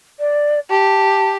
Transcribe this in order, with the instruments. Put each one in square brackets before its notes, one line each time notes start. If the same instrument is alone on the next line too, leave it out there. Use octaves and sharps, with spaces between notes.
[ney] D5
[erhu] G4 [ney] A5